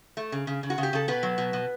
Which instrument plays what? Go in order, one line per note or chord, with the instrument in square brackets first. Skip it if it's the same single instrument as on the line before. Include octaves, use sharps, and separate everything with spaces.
[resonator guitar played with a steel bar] A3
C#3
C#3
C#3
F#4
C#3
G4
C#3 A4
B2 B3 B4
F#3
B2
B2